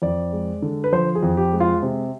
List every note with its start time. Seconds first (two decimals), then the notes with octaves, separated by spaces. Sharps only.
0.02 F2 D5
0.32 G#3
0.62 D3
0.84 B4
0.92 F3 C5
1.15 G#4
1.23 F2
1.37 G4
1.53 G#3
1.60 F4
1.83 C3